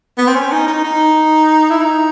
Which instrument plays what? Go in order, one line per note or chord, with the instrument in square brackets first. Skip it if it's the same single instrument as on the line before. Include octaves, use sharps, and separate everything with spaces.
[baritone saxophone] B3
C4
C#4
D#4
D#4
D#4
E4
D#4